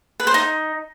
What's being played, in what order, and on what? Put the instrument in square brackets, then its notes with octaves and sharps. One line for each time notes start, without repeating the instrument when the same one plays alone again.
[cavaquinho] B4
C5
D#4